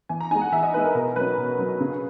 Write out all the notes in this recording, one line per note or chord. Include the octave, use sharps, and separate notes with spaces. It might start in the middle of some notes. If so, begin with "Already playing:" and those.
E3 G#5
A#5
G#3 D#4 G#5
F#5
E3 E5
D#5
G#3 D#4 B4
A#4
B2 A#4
F#3 C#4 B4
B2
F#3 C#4
C#3